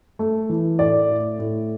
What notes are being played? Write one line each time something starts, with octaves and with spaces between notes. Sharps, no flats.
A3
E3
A2 D5
A2
A2